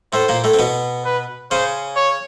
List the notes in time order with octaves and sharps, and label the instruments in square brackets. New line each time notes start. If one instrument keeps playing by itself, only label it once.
[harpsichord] A2 A3 [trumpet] C5
[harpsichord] A#2 A#3
A2 A3
C4
B2 B3
[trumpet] B4
[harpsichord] C#3 C#4 [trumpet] C5
[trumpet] C#5